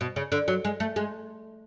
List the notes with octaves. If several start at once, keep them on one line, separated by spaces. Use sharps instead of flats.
B2
C#3
D3
F#3
G#3
A3
G#3